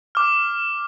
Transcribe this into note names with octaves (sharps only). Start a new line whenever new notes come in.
D6 F6